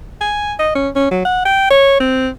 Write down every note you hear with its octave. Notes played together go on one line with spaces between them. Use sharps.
G#5
D#5
C#4
C#4
F#3
F#5
G5
C#5
C4